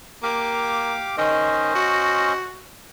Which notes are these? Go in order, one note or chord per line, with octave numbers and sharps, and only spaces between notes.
A#3 G4 F5 D6
D#3 C#4 C5 D#5
F#4